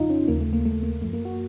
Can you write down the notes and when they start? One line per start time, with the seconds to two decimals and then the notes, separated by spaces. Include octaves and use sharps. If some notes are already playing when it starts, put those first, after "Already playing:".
Already playing: F2 C#3 F3 D#4 F4
0.10 C#4
0.28 D#2 C#3 F3 A#3
0.41 A3
0.53 A#3
0.65 A3
0.83 A#3
1.01 F#2 A3
1.05 F3
1.13 A#3
1.25 F#4